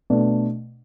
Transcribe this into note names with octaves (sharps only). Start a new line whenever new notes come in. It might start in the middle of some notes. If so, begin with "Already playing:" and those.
B2 A3 D4